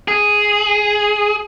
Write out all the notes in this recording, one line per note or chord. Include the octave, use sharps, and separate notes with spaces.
G#4